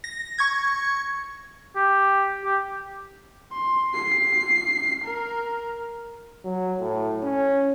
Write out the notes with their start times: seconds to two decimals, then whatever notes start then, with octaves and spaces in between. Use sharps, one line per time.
0.04 A#6
0.38 C#6 G#6
1.76 G4
2.44 G4
3.52 C6
3.94 C7
5.04 A#4
6.45 F#3
6.80 A2
7.23 C#4